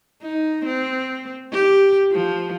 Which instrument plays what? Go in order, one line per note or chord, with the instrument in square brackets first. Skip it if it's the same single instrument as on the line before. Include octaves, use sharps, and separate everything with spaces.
[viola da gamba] D#4
C4
G4
F3